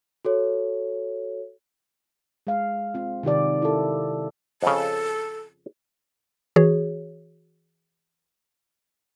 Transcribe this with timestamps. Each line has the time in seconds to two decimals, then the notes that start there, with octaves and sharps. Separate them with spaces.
0.25 F#4 A4 C#5
2.47 G#3 F5
2.94 C4 F4
3.23 C3 D#3 G4 D5
3.62 E4 A4
4.62 F2 C#3 A4
6.56 E3 F#4 G#4 C#5